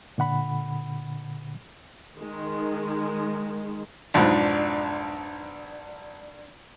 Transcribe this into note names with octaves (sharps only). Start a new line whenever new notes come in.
A#2 D3 F#5 B5
D#3 G#3
B1 F2 G#2 D4